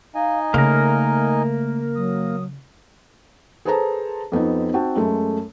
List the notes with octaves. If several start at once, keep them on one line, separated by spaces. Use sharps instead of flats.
D#4 D#5 F5 G#5
C#3 A3 A#3 A#4
F#3 D#6
G#4 A4 B4 C5 A5 A#5
F2 B3 C4 D#4
C4 D#4 F#4 G5 A5
F#2 G#3 A3